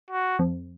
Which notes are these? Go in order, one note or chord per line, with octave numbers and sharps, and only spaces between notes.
F#4
F2